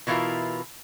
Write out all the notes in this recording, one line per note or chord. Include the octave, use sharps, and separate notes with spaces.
B2 E3 E4 F4 A#4